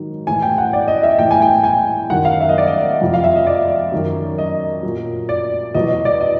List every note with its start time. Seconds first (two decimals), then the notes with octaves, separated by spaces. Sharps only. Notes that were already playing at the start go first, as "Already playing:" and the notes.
Already playing: G#2 D#3 F#3
0.27 A2 E3 G#5
0.42 G5
0.58 F#5
0.73 D5
0.88 D#5
1.03 E5
1.18 A2 E3 G5
1.31 G#5
1.42 G5
1.64 G#5
2.10 F#2 D#3 F#3 F#5
2.25 F5
2.40 E5
2.49 D#5
2.58 D5
2.67 D#5
3.01 F2 C3 F3
3.14 F5
3.24 E5
3.36 D#5
3.47 D5
3.92 F#2 D#3 F#3
4.38 D#5
4.83 A#2 F#3
5.29 D5
5.75 E2 B2 F#3 D#5
6.05 D5
6.20 D#5